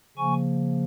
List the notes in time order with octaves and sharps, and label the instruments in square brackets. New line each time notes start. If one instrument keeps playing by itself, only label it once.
[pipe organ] C#3 F3 A#3 G#5 C#6